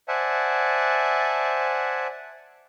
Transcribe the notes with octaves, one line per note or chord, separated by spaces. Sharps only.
C5 D5 E5 F#5 G#5 A5